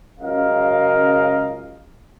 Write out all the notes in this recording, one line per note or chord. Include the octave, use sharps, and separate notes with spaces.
C#2 F#2 C#3 A#4 D#5 F5